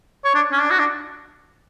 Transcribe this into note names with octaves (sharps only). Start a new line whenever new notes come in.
C#5
D4
C#4
D4
F#4
D4